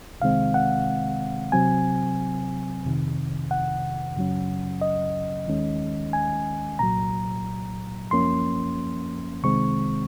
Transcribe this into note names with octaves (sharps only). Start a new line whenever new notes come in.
C2 C3 D#3 G#3 C4 F5
F#5
C3 F#3 C4 G#5
F2 C3 D#3
F#5
F#2 C#3 F#3 C#4
D#5
D#2 D#3 G#3 C#4
G#5
C2 A#2 F#3 A#5
F#2 F3 A#3 C#4 C6
C2 C3 D#3 G#3 C4 C#6